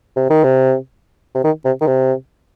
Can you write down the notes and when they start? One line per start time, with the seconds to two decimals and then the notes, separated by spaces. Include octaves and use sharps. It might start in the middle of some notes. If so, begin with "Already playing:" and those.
0.16 C3
0.30 D#3
0.44 C3
1.35 C3
1.44 D#3
1.65 C3
1.81 D#3
1.87 C3